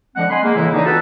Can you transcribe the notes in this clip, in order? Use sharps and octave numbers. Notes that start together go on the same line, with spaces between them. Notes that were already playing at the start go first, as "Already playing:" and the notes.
D3 F3 G#3 C4 F#5
D#5 G#5 B5 C6
G#3 A#3
A2 C#3 E3 E4
D3 E3 A#3 D#4
B3 C4 F4 F#4 A4 B4